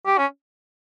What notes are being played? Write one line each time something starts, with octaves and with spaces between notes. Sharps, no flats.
G4
C#4